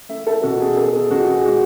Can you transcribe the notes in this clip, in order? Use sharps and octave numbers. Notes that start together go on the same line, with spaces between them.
A3 E5
A4
B2 F#4
G#4
B3 A4
G#4
B2 F#4
G#4
G#3 F#4